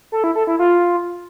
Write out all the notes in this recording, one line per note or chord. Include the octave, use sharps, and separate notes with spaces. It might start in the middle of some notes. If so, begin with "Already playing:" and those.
A4
E4
A4
E4
F4